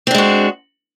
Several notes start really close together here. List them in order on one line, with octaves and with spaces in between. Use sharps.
C4 D4 G#3 F#4